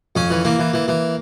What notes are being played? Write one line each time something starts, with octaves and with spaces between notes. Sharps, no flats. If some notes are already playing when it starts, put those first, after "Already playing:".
F2 C#4
E3
E3 A#3
E3
E3
E3